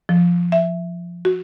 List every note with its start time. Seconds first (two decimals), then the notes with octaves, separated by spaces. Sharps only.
0.09 F3
0.52 E5
1.25 F#4